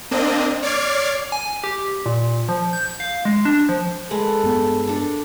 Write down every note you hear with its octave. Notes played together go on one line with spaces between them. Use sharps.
A#3 C4 D4 D#5
C#5 D5 D6 F6 G#6 C7
G#5
G4
A#2
F3
G6
F5
G#3
D4
F3
G#3 A4 B4
G2 B3
D4 A4